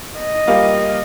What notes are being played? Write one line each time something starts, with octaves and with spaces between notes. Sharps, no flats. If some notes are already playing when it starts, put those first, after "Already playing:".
D#5
G3 A#3 F4